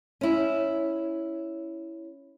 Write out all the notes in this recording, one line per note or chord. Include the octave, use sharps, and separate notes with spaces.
C#4 E4